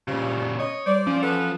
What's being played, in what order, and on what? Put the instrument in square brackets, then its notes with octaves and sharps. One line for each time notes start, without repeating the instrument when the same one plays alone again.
[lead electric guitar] A#2 C#3 [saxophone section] F3 G3
[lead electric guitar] C#5 [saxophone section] D#5
[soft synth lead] G3 [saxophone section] C5 D5
[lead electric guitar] F3 [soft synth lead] C#4
[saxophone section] B3 A4 B4